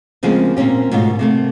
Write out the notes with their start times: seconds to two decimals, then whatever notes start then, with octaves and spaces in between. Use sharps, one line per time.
0.23 D2 C#3 F3 G#3 A#3 C4
0.56 A#2 A#3 C4 C#4 G4
0.91 G#2 B2 D3 A3 A#3 F4
1.19 C3 A3 A#3